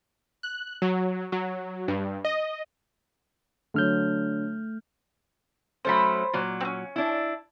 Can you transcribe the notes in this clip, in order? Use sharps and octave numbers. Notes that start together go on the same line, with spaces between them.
F#6
F#3
F#3
G2
D#5
D3 F#3 A3 F6 G6
F#3 A3 C#4 C5 B5
A#2 F#3
C4 C#4
D4 E4